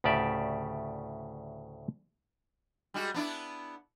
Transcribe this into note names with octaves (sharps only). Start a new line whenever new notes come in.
D2 A2 C#3 G4 D5 E5
G3 G#3 F#4
B3 D4 E4